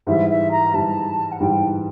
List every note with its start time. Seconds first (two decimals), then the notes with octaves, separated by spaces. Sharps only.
0.07 G#2 E3 G3 E5
0.29 E5
0.51 A#5
0.74 G#2 E3 G3 A5
1.31 F#5
1.40 G#2 E3 G3 G5